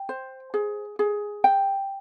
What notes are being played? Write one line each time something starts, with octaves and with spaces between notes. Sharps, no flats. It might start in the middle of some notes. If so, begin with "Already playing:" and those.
Already playing: G5
C5
G#4
G#4
G5